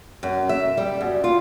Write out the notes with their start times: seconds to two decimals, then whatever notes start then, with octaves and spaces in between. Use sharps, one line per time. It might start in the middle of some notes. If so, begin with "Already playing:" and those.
0.23 F#2
0.49 E5
0.77 G3
1.01 F#2
1.24 F4